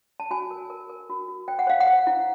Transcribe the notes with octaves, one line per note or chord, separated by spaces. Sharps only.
A5
F#4 G#5
A#4
A#4
A#4
F#4
F#4
C5 G5
F#5
C5 F5
F#5
C5
E4